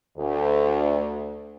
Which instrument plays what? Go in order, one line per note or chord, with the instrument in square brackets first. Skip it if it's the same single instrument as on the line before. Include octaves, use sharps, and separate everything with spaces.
[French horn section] D2